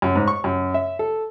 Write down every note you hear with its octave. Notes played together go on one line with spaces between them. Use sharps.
F#2
G#2
C#6
F#2
E5
A4